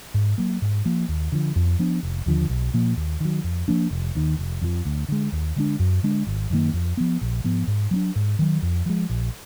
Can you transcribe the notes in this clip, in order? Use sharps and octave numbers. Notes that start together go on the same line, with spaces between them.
G#2
F#3 A#3
G#2
F3 A#3
D#2
D3 F3
F2
F3 B3 D4
F1
D#2 D3 F3
B1
A#2 F3 A#3
D#2
D#3 F#3
F2
F3 A#3 D4
F1
D#2 D#3
F1
F2 F3
D2
D3 G#3
D#2
D3 G#3 D4
F#2
D3 G#3 D4
G#1
F#2 D#3 A#3
F2
F3 B3
A#1
G#2 F3 B3
G#2
F#3 A#3 D4
G#2
D#3 F#3
F2
F3 G#3
A#1